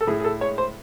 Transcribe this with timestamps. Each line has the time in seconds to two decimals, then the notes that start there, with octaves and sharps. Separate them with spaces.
0.01 A4
0.07 A2 G#4
0.20 G#4
0.24 A4
0.41 G#3 C#5
0.58 C5